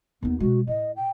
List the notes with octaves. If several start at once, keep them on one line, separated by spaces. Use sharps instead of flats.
D#2 B3 D#4
B2 G#3 F#4
A2 D#5
G5